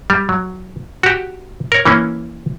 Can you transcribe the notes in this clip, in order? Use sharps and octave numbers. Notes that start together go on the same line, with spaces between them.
G3
F#3
F#4 G4
A#4 C#5
E3 A#3 C#4